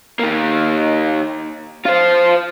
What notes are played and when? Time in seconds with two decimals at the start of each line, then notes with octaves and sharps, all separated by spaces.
0.20 D#3 A#3
1.85 F4 C5